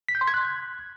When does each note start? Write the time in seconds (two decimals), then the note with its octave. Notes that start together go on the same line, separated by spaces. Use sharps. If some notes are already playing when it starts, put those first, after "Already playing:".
0.09 B6
0.15 G6
0.21 C6
0.27 G#6
0.34 F#6